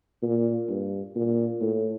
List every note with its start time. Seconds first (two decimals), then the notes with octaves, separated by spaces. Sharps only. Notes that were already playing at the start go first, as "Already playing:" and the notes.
0.23 A#2
0.69 G2
1.16 A#2
1.61 A2